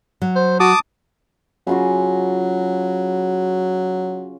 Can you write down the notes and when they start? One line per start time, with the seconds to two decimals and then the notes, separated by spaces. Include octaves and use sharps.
0.22 F#3
0.36 C5
0.60 F#4 A5 D6 D#6
1.67 C#3 F#3 F4 F#4